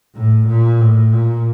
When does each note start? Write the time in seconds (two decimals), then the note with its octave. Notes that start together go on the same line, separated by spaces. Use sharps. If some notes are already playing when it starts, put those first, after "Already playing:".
0.16 A2
0.48 A#2
0.81 A2
1.13 A#2